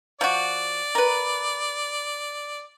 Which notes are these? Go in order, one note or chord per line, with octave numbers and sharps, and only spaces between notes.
F3 F#4 D5
A#4 B4